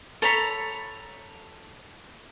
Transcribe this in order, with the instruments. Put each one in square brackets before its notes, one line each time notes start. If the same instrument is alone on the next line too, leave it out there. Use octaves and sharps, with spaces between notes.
[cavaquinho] A4 C#5 A#5 B5